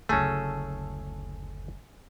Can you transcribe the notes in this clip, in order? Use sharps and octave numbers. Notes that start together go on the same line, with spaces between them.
F#1 D2 A3 C#4 G#4 A4